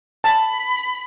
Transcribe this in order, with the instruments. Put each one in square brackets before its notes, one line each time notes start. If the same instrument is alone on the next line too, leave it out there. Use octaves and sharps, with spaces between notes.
[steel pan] A5 [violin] B5